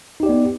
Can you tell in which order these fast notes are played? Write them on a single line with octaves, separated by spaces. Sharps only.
D#4 G4 D5 B3